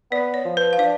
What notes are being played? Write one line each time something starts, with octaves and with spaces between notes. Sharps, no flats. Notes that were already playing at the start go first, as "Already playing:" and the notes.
B3 D5
C#5
F3
B4
F5
D4 D5